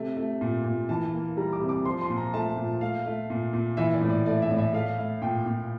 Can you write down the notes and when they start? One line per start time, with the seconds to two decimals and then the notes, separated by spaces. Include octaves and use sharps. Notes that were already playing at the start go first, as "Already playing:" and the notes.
Already playing: C3 A3
0.17 A3
0.41 A#2
0.65 A#2
0.89 E3 A5
1.13 A#3
1.37 G3 A#5
1.53 D6
1.61 C3
1.69 D6
1.85 F3 C6
2.01 C6
2.09 A#2
2.17 A#5
2.33 A3 A5
2.57 A#2
2.81 A3 F5
3.06 A3
3.30 A#2
3.53 A#2
3.77 E3 E5
3.93 D5
4.02 A2
4.10 D5
4.26 A3 D5
4.42 E5
4.50 A2
4.58 E5
4.73 A3 F5
4.98 A3
5.22 A#2 G5
5.46 A#2